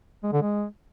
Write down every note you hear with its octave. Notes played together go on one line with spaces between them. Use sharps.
G#3
D3
G#3